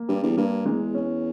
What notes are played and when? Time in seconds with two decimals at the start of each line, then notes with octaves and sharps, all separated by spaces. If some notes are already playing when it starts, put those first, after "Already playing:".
Already playing: A#3
0.09 G2 G3
0.23 E2
0.37 G2 A#3
0.66 E2 G#3
0.95 C#4